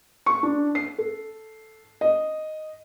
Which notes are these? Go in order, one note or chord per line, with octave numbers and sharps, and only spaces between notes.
C#6
D4
C7
A4
D#5